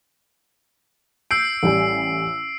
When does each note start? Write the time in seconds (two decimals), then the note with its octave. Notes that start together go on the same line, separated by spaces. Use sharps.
1.31 E6 G6 C7 D7
1.63 A1 G3 G#5